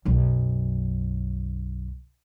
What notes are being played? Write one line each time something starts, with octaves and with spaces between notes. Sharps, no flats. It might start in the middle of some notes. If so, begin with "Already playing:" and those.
B1 F#2